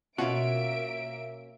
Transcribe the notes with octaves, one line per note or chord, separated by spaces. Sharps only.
B2 A#3 C#4 F4 F#4 E5 D7